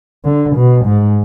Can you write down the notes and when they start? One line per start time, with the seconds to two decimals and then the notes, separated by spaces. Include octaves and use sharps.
0.25 D3
0.55 B2
0.86 G#2